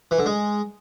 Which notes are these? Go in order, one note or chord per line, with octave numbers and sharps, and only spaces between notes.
E3
D3
G#3